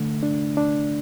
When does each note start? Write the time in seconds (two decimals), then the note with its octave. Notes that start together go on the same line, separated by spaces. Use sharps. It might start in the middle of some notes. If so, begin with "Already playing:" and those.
Already playing: D3 A3
0.23 D4
0.57 D4